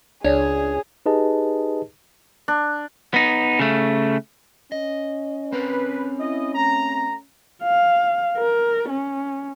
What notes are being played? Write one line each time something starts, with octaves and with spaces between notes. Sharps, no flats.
C#2 D4 G#4 C#5
D#4 G4 G#4 B4 D#5 A5
D4
B3 D#4
C#3 A3
C#4 D#5
C4 A#4 B4
E4 D#5
A3 A#5
F5
A#4
C#4